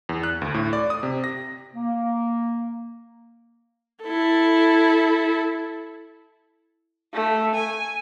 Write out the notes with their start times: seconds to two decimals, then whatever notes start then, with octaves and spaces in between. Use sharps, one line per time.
0.09 E2
0.23 F#6
0.42 D2
0.54 A2
0.73 D5
0.90 D#6
1.03 C3
1.24 A#6
1.75 A#3
4.04 E4 A4
7.14 A3
7.55 G#5